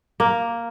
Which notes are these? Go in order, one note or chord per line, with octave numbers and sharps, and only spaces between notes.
A#3